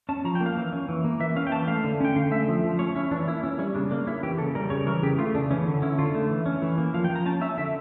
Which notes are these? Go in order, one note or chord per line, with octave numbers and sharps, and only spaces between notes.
C#4 A5
F3 A#5
G5
A#3
F5
E3
C#4
E3
A#3
E3 E5
C#4 F5
G5
E3 A5
A3 F5
D3
C#4 G5
D3 F5
A3 E5
F3
F3
C#4 C#5
C#4 E4
E3 D4
A#3 E4
C#4 E4
G3 C#4
C#3 D4
A#3 D4
C#4 E4
E3 G4
C#3 A4
G3 A#4
C#3 C#5
E3 A#4
C#3 G4
A3 F4
C#3 D4
E3 C#4
D3
C#4 E4
D3 F4
A3
E3
C#4
E3
A#3
F3 F5
G5
F3
A#5
C#4 A5
C#4 E5
D3 E5